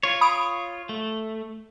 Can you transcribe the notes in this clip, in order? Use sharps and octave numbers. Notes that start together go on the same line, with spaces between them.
F4 C#5
B5 D#6 D7
A3